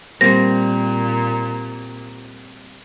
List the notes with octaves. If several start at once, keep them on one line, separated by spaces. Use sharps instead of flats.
A#2 G3 A#3 C4 A#6